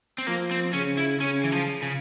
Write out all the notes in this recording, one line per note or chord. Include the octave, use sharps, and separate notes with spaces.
C4
F3 A#3
C4
C#3 C#4
E4
C#3 C#4
E3
F3
C#3